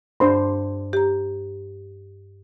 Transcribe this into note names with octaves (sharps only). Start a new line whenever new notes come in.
G2 D4 C5 C6
G4 A#5